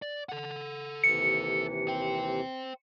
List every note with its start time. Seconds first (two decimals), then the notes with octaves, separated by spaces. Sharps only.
0.02 D5
0.29 A4 F#5
1.04 D#2 C3 E3 C#7
1.88 C5 G5